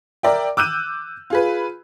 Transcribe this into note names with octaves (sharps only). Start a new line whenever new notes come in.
A#4 D5 E5 G5
D6 E6 F#6 G6 D#7
F4 G#4 B4